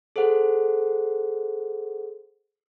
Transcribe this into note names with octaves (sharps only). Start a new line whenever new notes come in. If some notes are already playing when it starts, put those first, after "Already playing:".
G#4 A4 C5 F#5